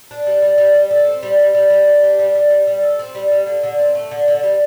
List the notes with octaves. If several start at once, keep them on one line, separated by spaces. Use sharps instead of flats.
D4
G3
G3
G3
G3
A4
C4
G3
G3
G3
G3
G4
D4
G3
G3
G3
G3
A4
C4
G3
G3
D3
D3
C4
A3
D3
D3
G3